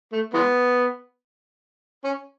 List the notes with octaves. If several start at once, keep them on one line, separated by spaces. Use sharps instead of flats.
A3
E3 G#3 B3
C#4